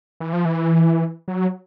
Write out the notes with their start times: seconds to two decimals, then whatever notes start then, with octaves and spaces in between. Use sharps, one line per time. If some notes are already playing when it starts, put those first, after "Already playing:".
0.20 E3
0.33 F3
0.45 E3
1.28 F#3